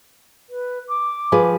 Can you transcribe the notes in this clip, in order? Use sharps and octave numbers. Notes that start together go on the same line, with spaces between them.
B4
D6
F3 G#4 B4